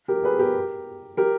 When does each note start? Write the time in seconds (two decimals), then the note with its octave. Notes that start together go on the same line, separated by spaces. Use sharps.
0.08 G4 A#4
0.23 G#4 B4
0.39 G4 A#4
1.17 G4 A#4